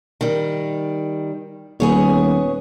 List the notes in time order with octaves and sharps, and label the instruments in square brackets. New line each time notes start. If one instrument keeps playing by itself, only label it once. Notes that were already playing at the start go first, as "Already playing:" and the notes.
[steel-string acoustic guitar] D#3 G3
[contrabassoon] D#1 [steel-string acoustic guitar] B3 G#4 C#5